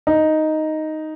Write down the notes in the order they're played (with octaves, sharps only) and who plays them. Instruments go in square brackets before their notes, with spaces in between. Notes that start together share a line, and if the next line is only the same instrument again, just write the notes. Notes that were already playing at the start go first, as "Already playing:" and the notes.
[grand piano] D#4